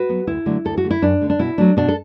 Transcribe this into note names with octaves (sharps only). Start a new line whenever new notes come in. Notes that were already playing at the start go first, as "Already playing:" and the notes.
Already playing: F#4 B4
F#3 B3
D2 E4
D3 F#3 A3
D2 A4
F#4
D3 A3
E4
F#2 D4
D3 A3
D4
B2 E4
F#3 A3 D4
B2 D4
A4